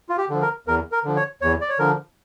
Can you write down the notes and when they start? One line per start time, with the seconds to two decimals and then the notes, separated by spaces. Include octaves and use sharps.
0.09 F4
0.18 G4
0.30 D3 F3
0.42 A#4
0.67 E2 A#4
0.92 A#4
1.04 D3 F3
1.16 C#5
1.42 E2 C#5
1.61 D5
1.69 C#5
1.79 D3 F3 A#4